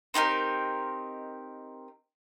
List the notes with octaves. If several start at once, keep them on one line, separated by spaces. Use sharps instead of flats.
C4 D#4 G4 A#4